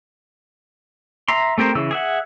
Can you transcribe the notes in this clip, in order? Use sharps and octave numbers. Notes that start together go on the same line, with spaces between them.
E5 A#5 C6
A3 C4 G4 A#4 C5
C#3 E3 E6
G#4 E5 F#5